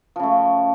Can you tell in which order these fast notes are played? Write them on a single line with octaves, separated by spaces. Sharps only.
F3 C#3 A3